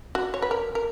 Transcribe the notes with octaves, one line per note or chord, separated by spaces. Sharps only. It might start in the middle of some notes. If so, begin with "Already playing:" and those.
F#4
C#5
B4
A#4
A#4